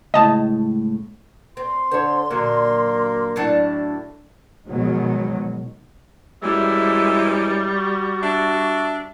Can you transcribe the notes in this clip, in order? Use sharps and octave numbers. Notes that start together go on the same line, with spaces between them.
C#2 A2 D#5 A5
C4 C6
D3 C5 C#5
A#2 D3 F#3 A#3
A2 F#3 D4
B2 D#3 F3 F#3 G#3 B3
F#2 E3 G3 G#3 E5
F#4
D4 E5